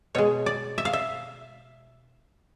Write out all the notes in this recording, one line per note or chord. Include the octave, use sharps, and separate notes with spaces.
B2 G#3 C#5
D5
E5
F5
E5